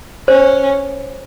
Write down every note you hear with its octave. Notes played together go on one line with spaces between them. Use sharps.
C#4 C5